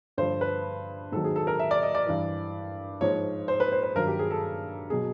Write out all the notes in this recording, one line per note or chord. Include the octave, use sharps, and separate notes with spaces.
G2 D3 F3 C5
B4
G#2 D#3 F#3 A4
G#4
A4
A#4
E5
D5
D#5
D5
G2 E3
G#2 F3 C#5
C5
B4
C5
B4
G2 D#3 F#3 A#4
G4
G#4
A4
B2 F#3 G#4